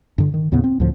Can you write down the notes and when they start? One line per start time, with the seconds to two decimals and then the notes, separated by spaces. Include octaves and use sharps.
0.18 G2 D3
0.34 D#3
0.52 D#2 A2 C#3 B3
0.64 C4
0.80 D2 A2 D3 F3